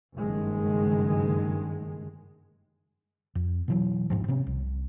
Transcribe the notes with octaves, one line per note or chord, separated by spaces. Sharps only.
F#1 G2 D#3 G#3
F2
B2 E3 F#3
G1 D2 G#2 F3
C3 B3 C#4
C2